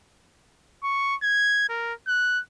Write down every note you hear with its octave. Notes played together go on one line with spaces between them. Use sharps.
C#6
G#6
A#4
F#6